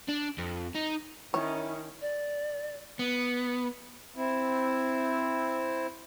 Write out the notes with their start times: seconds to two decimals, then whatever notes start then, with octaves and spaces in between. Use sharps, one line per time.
0.09 D4
0.38 F2
0.75 D#4
1.34 D#3 C#4 E4 C#5
2.01 D5
2.99 B3
4.16 C4 E4